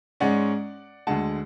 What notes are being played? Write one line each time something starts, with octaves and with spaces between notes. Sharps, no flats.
G#2 G#3 C#4 D5 F#5
D2 D3 G#3 F#5 A5